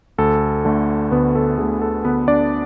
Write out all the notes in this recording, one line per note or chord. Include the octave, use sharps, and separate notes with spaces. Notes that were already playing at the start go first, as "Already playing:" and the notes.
D2 A4
D3 A3
D2 B3 B4
A4
D3 A3 G#4
A4
D2 B3 B4
D4 D5